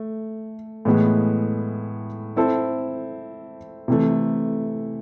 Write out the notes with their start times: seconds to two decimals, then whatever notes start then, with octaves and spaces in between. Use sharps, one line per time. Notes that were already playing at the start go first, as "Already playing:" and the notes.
Already playing: A3
0.85 A2 E3 G#3 B3
2.36 C4 E4 A4 C5
3.88 C3 E3 A3